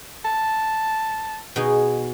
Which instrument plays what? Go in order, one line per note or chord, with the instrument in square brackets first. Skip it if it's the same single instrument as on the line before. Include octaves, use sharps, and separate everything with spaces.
[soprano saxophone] A5
[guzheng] B2 D#4 G#4